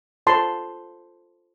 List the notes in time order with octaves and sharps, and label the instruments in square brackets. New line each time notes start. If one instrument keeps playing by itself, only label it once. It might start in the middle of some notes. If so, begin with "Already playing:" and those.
[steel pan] F4 A4 C5 A5 C6